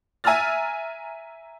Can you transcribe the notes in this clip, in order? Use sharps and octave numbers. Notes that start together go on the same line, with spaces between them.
E5 G#5 A#5 E6 F6 A6